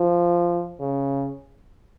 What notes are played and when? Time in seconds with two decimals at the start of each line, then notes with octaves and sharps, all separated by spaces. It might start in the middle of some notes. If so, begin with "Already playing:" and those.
Already playing: F3
0.80 C#3